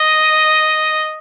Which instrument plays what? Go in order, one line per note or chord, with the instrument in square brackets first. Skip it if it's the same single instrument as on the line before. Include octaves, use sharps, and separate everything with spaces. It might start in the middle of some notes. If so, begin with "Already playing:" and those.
Already playing: [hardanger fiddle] D#5